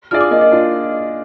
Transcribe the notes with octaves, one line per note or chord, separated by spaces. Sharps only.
D4 F4 G#4 D5 F6
D6
A#3 D#5
D#5
D4 F4